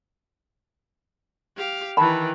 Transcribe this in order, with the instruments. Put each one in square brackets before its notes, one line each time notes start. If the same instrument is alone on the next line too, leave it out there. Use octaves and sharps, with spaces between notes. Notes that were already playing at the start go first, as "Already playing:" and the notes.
[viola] G4 F5
[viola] D#3 E3 [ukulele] A5 B5